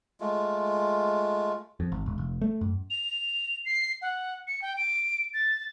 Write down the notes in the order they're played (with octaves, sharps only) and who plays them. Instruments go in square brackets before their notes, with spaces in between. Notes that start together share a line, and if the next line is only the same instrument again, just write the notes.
[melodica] G#3 A3 F4
[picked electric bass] F2
G#1
E1
F1
A3
F#2
[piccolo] F7
C7
F#5
C#7
G5
D7
A6